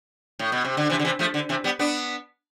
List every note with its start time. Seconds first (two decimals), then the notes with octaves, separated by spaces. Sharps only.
0.39 A2
0.52 B2
0.65 C3
0.77 D3
0.90 C3 E3
0.99 D3
1.05 C3 E3
1.19 F3 A3
1.34 D3
1.49 C3 E3
1.64 G3 B3
1.79 B3 D4